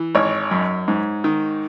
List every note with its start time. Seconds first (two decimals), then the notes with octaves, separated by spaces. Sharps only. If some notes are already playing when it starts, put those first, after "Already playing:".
Already playing: E3
0.15 G#1 C#5
0.51 F#2
0.88 G#2
1.24 D#3